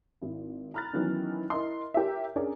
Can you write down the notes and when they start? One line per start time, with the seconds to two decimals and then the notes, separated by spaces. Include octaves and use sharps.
0.22 G#1 E4
0.74 A#5 B5 F6 F#6 A6
0.93 D#3 E3 F#3 B3 C#4
1.50 E4 A#4 D#5 C6
1.94 G4 A#4 C#5 E5
2.36 C#4 D4 G#4 A#4 C#5 D5